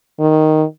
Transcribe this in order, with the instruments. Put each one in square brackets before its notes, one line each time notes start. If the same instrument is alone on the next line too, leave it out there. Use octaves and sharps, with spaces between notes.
[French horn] D#3